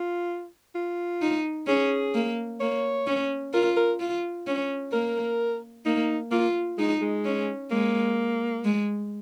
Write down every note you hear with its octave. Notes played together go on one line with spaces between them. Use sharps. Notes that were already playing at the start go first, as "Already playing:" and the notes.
Already playing: F4
F4
D#4
C#4 G#4
A#3
A#3 C#5
C#4
F4 A#4
A#4
F4
C#4
A#3 A#4
A#3 D#4
A#3 F4
G#3 D#4
G#3
C#4
G#3 A#3
G#3